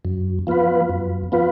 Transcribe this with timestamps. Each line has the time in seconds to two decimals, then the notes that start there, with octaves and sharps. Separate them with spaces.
0.05 F#2
0.47 F3 B3 F4 B4
0.89 F#2
1.32 F3 B3 F4 B4